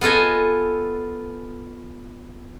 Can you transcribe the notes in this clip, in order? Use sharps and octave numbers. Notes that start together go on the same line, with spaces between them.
B3 F4 A4 D#5 G#5